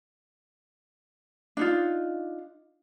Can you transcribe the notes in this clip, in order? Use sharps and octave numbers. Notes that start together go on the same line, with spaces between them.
D4 D#4 F4